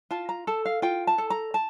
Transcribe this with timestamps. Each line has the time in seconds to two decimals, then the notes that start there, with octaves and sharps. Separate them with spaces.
0.11 F4 A5
0.29 A#5
0.47 A4 A5
0.65 F5
0.82 F4 G5
1.07 A5
1.18 A4
1.30 A#5
1.54 A5